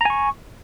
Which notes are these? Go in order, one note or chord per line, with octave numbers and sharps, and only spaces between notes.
G#5 A#5 C#6